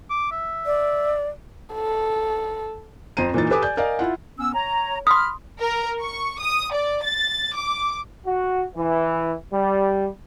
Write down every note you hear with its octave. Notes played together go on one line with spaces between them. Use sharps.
D6
E5
D5
A4
F2 C5 A#5 D#7
A#2 E3 D#4 A6
G4 A4 B4 G#5 D6 D#6
D5 G#5 G6
A#4 D5 D#5 F5 G#5
E4 F4 F#5
B3 C#4 E6
C#5 A#5
B5 C6 D#6 F6
A#4
C#6
D#6
D5
A6
D6
F#4
E3
G3